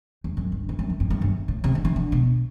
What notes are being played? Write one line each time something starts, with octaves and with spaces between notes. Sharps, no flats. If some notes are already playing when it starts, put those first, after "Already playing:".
E2
F#2
G2
E2
F#2
E3
G2
G2
F#2
A2
C3
D3
E3
D3
B2